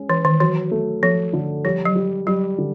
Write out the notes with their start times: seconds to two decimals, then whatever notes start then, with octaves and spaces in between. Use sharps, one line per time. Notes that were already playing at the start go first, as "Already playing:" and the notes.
Already playing: G#3 C#4
0.09 E3 B4
0.25 D#3
0.40 E3 F#3
0.71 A3
1.03 F3 A3
1.33 D3
1.65 F3 G3
1.85 F#3
1.95 G3
2.27 F#3 G3
2.58 D3